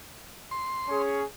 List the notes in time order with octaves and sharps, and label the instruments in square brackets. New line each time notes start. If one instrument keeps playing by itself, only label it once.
[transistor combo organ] C6
[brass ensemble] C#4 G#4 C#5